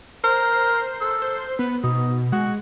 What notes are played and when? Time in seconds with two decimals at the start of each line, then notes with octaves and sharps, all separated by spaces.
0.24 A#4 C5
1.01 A4
1.22 C5
1.59 B3 B4
1.83 B2 D#4
2.32 G#3 F#4